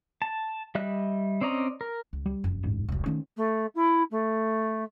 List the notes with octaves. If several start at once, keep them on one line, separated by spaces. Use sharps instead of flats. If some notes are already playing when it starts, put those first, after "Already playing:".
A5
G3 D#5 E5 F#6
C4 C#4 D5 D#5 A#5
A#4
C#2
G3
F1 F#2
D#1 A1 G#2
E1 C2 F#3
D#3 A3 C4 C#4
A3
E4
A3